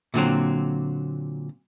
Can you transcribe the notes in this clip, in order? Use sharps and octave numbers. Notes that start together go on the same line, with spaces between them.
A#2 D3 F#3 C4